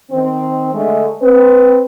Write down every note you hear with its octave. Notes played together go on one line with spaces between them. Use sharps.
D#3 C4
D3 G#3 A3
C4 B4